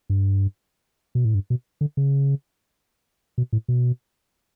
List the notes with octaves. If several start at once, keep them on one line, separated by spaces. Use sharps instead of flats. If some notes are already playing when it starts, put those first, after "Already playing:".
G2
B2
A2
G2
B2
D3
C#3
B2
A2
B2